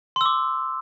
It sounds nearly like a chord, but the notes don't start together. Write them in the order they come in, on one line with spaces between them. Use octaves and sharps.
C6 E6 D6